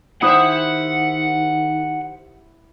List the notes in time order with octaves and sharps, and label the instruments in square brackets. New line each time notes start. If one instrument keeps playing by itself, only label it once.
[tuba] D#3 [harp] E4 D#6 F#6 [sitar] G4 C5 E5 [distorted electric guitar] F#5